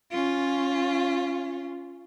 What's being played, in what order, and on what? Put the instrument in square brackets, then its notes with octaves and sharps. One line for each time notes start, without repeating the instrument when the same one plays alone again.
[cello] C#4 F4